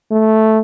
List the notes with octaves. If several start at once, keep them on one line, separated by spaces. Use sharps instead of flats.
A3